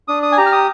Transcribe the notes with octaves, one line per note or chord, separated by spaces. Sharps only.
D4 D#6
D#6
G#5
G4 A#5
F6
D#6